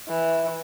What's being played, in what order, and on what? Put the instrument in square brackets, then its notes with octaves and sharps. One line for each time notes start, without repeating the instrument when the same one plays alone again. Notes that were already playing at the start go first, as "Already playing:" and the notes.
[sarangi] E3